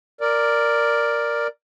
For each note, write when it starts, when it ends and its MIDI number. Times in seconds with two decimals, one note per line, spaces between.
0.21 1.47 70
0.21 1.47 74